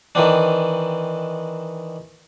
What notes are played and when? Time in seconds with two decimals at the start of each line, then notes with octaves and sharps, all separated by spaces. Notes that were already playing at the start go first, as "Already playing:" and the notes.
0.15 D#3 E3 C4 D4